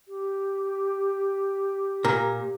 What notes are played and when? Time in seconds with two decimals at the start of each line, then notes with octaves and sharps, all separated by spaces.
0.07 G4
2.05 A#2 A#4